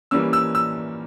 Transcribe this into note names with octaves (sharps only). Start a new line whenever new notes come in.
E3 G3 A#3 C#4 E6
E6
E6